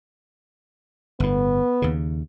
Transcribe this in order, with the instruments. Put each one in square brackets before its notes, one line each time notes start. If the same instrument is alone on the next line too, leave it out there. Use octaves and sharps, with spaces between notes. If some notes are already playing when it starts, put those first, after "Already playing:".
[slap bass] G1 A2 [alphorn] B3
[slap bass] D#2 C#3